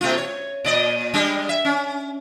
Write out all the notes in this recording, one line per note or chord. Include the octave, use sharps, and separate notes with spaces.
B2 A3 F4
C#5
A#2 D5 D#5
G3 G#3 D4
E5
C#4